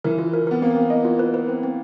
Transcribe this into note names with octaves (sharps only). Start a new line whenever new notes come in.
E3 A#4
F4
A#4
B3 A#4
A#3 C4
C4
D#5
F4
B4
B4
C4
C4